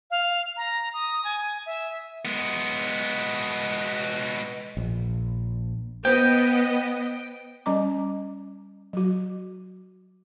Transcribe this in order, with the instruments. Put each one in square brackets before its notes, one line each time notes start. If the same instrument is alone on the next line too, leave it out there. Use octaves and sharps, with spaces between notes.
[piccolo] F5
A#5
D#6
G#5
E5
[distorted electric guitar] G#3 B3
[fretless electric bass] A#1
[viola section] B3 D#5 [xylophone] C5 [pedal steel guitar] G5
[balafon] G3 C#4 D#5 A#5 D6
F#3 F#4